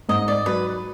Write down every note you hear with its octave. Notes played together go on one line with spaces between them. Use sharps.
G#2 D#5
D5
F#3 B4